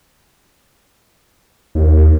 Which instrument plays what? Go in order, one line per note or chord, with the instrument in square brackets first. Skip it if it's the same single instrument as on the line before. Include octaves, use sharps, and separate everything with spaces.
[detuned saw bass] D#2